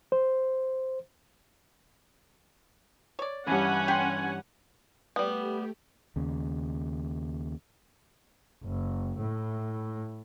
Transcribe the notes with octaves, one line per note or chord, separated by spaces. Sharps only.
C5
C#5 D5
G2 E3 C#4 F#5 G#5
G4 C6
G3 A3 B3 G4
D#2 C#3
F#1
A2